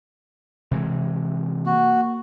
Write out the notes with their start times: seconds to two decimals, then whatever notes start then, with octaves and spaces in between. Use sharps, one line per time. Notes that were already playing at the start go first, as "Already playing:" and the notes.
0.71 C3 E3 G#3
1.66 A#3 F#4